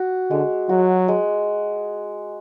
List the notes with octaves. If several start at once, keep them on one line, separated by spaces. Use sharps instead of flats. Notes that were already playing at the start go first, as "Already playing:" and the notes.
Already playing: F#4
D3 G#3
F#3 F#4
G#3